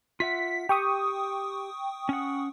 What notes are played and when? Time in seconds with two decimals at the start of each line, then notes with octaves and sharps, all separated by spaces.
0.20 F4 E5 F#5 B6
0.69 G4 G5 C#6 D#6
2.09 C#4 F#5